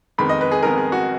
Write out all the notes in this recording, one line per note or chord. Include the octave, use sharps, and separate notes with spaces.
F2 D#3 G#3 B3 B5
D#5
B4
G#4
F2 D#3 G#3 B3 A#4
G#4
F#4